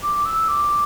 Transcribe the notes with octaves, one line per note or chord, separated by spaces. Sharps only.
D6
E6
D6